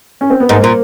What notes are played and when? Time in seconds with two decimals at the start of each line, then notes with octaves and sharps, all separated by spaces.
0.21 C#4
0.30 C4
0.40 B3
0.49 G#2 A#3
0.60 A#2 A#3